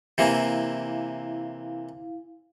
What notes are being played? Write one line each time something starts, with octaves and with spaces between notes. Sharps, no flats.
C3 E3 A#3 E4 F5